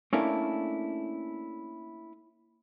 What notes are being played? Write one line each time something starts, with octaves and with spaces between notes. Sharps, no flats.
A3 A#3 C#4 D4 E4